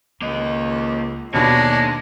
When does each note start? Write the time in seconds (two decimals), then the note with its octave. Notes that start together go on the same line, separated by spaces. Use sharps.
0.22 C#2 A#3 D#5
1.34 D#2 B2 G#3 A#3 D4 C#5